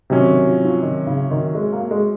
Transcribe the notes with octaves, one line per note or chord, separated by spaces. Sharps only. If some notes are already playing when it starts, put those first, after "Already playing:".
C3 D#3 F#3 C#4
D#3
F3
F3
D#3
C#3
D#3
G#3
A#3
G#3